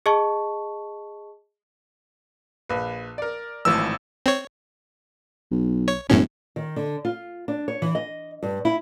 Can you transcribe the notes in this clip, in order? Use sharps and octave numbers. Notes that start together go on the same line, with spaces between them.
G#4 D#5 A5 C#6
A#1 B4
A#4 D5
G#1 A2 E3 F3 E6
C4 C#5
B1
C#5
E1 F#2 A2 C#4
D#3
D3
F4
D4
C#5
E3
D#5
G2
E4